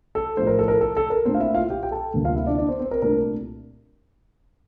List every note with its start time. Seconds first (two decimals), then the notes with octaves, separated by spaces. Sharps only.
0.15 A4
0.37 A2 F3 A3 C5
0.47 A#4
0.59 A4
0.68 A#4
0.81 A4
0.97 A4
1.10 A#4
1.25 A#2 A3 C4 D4 C5
1.34 F5
1.40 E4 E5
1.55 F4 F5
1.70 G4 G5
1.83 G5
1.91 A4 A5
2.14 D2 C3 G3 A#3
2.24 F4 F5
2.35 E4 E5
2.47 D4 D5
2.58 D4 D5
2.69 C4 C5
2.79 C4 C5
2.91 A#4
3.02 C2 A#2 A3 D4 A#4